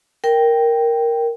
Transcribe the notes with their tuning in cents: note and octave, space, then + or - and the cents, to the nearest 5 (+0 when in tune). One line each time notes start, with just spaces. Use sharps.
A#4 +0 G5 +0